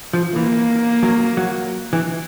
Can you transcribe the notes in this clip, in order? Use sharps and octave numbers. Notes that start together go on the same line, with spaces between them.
F3
E3 A#3
F#3
F#3
E3